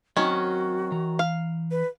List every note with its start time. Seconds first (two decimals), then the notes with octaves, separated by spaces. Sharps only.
0.17 D#3 F#3 C4 C#4 F#4
0.92 E3 A#5
1.19 F5
1.71 B4